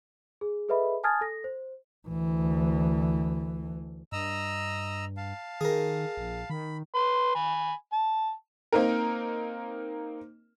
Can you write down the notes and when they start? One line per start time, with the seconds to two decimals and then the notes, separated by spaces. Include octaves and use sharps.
0.41 G#4
0.69 G#4 A4 B4 D#5 E5 B5
1.04 G#5 A5 D#6 F6 G#6 A6
1.21 A4 A#6
1.44 C5
2.08 D2 E3
4.12 G2 D#5 A#5 E6
5.17 F5 A5
5.61 D#3 G#4 A#4
6.17 A#1
6.50 D#3 B5
6.94 B4 C6
7.35 G#5 B5
7.92 A5
8.73 A#3 C4 D#4 A#4